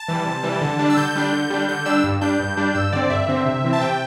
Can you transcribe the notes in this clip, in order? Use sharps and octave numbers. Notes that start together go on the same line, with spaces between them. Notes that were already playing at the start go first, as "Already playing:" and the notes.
Already playing: A5
E3 G3
C3
E3 G3
D3
G3 D4
E6
D3 G6
G3 D4
D3
G3 D4
D3 G6
G3 D4 E6
G2
G3 D4 G6
G2
G3 D4
G2 E6
D3 C4 D5
G2 E5
D3 C4
C3
E3 C4
A5
C3 G5